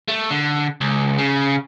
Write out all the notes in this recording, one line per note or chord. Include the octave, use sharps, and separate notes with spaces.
A3
D3
C#2
C#3